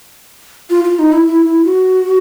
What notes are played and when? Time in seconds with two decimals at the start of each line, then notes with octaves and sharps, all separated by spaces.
0.70 F4
0.84 F4
0.99 D#4
1.12 E4
1.27 E4
1.46 E4
1.65 F#4